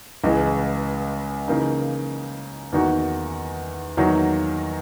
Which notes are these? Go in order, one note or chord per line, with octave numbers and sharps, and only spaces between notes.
C#2 C#3 E3 G#3
C#3 E3 A#3 D#4
E2 D#3 A#3 D#4 F#4
E2 D#3 F#3 A#3 D#4